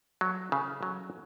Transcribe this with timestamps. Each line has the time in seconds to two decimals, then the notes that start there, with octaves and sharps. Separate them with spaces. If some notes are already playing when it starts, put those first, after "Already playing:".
0.21 F#3
0.52 C#3
0.83 F#3